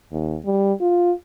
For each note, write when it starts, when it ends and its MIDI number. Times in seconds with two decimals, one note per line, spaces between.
0.12 0.39 39
0.45 0.73 55
0.81 1.12 65